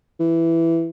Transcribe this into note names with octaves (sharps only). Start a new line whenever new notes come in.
E3